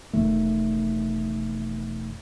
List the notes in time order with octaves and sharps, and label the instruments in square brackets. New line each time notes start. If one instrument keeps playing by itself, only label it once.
[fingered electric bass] E1 D#3 A3